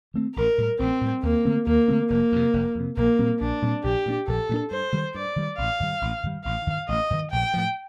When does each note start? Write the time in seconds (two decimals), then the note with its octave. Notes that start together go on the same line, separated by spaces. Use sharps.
0.14 D#3 A3 C4
0.36 A1 A#4
0.58 A2 G3
0.79 A1 C4
1.01 A2 G3
1.22 D#2 A#3
1.45 D3 A3 C4
1.66 D#2 A#3
1.88 D3 A3 C4
2.10 F1 A#3
2.32 F2 C3
2.53 F1
2.75 F2 C3
2.97 A#1 A#3
3.19 A#2 G3 C4
3.40 A#1 D4
3.62 A#2 G3 C4
3.84 A#1 G4
4.06 A#2 G3 D4
4.27 A#1 A4
4.49 A#2 G3 D4
4.71 G2 C5
4.92 D#3 G3
5.14 G2 D5
5.36 D#3 G3
5.58 A1 F5
5.80 G2 D#3 G3
6.01 A1
6.23 G2 D#3 G3
6.45 A1 F5
6.67 G2 D#3
6.88 A1 D#5
7.10 G2 D#3
7.31 A#1 G5
7.54 A2 F3